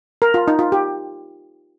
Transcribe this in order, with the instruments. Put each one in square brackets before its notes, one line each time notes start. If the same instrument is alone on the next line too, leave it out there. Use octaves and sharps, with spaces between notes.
[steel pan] A#4
F4
D#4
F4
G4